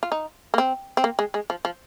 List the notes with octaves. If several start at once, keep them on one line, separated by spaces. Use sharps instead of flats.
F4
D#4
A#3
C4
C4
A#3
G#3
G#3
F3
F3